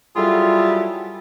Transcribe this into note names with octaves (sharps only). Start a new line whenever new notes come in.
F#3 G3 E4 F4 G#4 A4